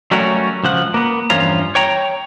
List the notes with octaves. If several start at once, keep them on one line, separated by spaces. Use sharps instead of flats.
F#3 G3 A3 C#4 F#4 A#4
C#2 F3 F#5
A#3 B3
E2 G2 F3 C#4 F4 A#5
C#5 G5 A#5